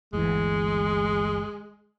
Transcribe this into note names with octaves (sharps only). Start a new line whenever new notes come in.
G1 D2 E3 G#3